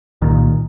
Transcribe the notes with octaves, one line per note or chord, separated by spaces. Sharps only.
C2 A#2 D#3